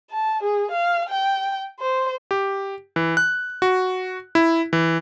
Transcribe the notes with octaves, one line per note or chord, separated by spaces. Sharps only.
A5
G#4
F5
G5
C5
G4
E3
F#6
F#4
E4
E3